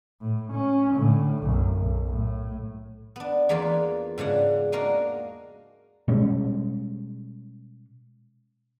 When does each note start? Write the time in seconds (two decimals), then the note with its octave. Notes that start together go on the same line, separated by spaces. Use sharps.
0.21 A2
0.52 C#4
0.94 A2 D3
1.43 B1 F#2
1.74 B1
2.08 A2
3.16 B3 D4
3.49 E2 E3 A#3 D4 F4
4.18 G#2 C#3 D4 F#5
4.72 G#3 A#3 D4 F#4 A#4
6.08 B2 G3 G#3 C#4